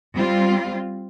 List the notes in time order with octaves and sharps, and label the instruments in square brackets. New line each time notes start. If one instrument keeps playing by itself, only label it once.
[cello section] G3 C4 F4